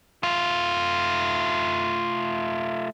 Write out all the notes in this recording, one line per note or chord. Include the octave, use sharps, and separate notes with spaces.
A3 F4